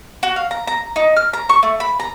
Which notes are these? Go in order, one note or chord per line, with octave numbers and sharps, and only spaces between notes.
F#4
F5
A#5
A#5
D#4
F6
A#5
C#6
A3
B5
A#5